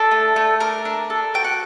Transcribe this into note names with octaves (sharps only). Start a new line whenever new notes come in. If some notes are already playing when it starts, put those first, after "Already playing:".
Already playing: D4 A4
A3
A3
D4 A#4
D4
A4
F#4 G5
F#5